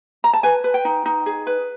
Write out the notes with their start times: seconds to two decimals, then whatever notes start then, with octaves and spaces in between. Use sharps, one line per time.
0.24 A#5
0.33 A5
0.43 B4 G#5
0.64 B4
0.74 G5
0.85 D#4
1.06 D#4
1.26 G#4
1.47 B4